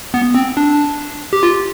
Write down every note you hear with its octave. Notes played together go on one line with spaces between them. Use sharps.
B3
C4
D4
G4
F4